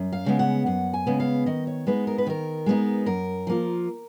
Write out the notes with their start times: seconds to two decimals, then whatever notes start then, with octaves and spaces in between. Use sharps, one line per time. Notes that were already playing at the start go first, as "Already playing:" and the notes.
Already playing: F#2
0.12 F5
0.26 C#3 G#3 B3
0.39 F#5
0.66 F#2 F#5
0.94 G#5
1.06 C#3 G#3 B3
1.20 F5
1.46 D#3 D#5
1.67 C#5
1.87 G#3 B3 D#4 B4
2.07 A#4
2.18 B4
2.27 D#3 A#4
2.66 G#3 B3 D#4
3.06 F#2 A#4
3.47 F3 A#3 F4